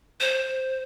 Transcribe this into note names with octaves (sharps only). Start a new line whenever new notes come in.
C5